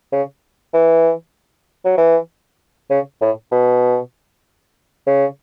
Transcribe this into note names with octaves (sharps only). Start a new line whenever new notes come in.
C#3
E3
F#3
E3
C#3
A2
B2
C#3